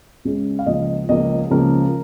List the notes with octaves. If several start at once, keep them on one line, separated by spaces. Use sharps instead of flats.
C#2 C#3 G#3
F5
C#2 C#3 F3 A#3 D#5
C#2 C#3 F3 A#3 D#5
C#2 C#3 F3 A#3 A#4